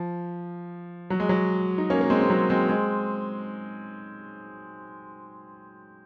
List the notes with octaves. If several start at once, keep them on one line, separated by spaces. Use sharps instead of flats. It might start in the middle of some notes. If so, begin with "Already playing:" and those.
Already playing: F3
F#3
G#3
F#3
D#4
A#3 C#4
A#3
G#3 C4
C4
F#3 A#3
G#3 C4
G#3 C4